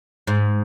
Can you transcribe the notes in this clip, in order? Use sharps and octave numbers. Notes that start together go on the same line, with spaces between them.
G#2